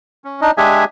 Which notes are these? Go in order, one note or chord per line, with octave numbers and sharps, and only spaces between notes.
C#4
D4 D#4 D#5
G#3 D4 G4 G#4 E5 G#5